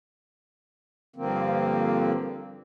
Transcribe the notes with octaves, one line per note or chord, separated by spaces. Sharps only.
G2 D3 F3 A#3 C4